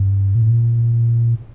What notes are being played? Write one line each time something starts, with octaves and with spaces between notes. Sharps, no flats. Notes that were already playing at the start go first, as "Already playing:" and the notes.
Already playing: G2
A#2
A2
A#2